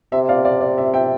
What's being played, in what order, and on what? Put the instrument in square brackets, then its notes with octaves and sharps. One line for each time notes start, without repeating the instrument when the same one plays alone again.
[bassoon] C3 [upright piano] E5
[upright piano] D5 F5
D5 F5
D5
E5
E5 G5